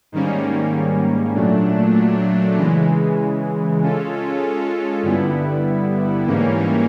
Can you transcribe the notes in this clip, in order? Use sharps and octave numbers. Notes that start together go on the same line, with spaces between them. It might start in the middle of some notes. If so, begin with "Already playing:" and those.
G#2 D#3 G3 A#3 C#4
A#2 F#3 A3 D4
C#3 E3 G#3
G#3 C#4 F4 A4
G2 D3 G3 B3 E4
G#2 E3 G3 A#3 C#4